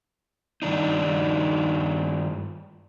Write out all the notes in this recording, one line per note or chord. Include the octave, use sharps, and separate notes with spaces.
G2 D#3 D4 D#4